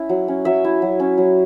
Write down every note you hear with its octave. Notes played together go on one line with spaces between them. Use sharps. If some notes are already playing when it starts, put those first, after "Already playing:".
Already playing: C#4 E4
F#3
C#4
F#3 E5
E4
F#3
C#4
F#3